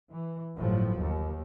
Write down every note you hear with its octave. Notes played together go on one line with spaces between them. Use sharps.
E3
G1 A2 F3 F#3
D#2